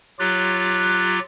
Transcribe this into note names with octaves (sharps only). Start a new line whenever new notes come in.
F#3 F4 G4 F#6 A6